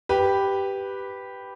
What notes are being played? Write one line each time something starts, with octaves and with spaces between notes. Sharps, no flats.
G4 B4